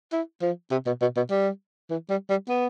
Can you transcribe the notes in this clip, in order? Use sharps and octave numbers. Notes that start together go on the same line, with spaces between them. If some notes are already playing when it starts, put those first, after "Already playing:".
E4
F3
C3
B2
B2
B2
G3
E3
G3
G3
B3